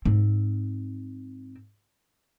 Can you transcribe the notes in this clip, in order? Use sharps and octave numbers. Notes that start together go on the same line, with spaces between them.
G#2 C4